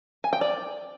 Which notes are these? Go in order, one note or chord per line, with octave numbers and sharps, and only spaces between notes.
G#5
G5
D5